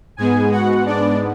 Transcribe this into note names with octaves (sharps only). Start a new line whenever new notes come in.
G#2 G#3 B3 G#4 G#5
F#4 F#5
D4 D5